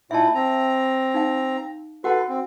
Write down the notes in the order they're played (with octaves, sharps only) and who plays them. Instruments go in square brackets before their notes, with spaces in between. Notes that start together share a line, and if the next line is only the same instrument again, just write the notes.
[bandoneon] A#2 D#4 E4 [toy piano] E5 A5
[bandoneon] C4 A#5
[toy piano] D#4 F5
[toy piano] F#4 F#5 [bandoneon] A4 B4
[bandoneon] C4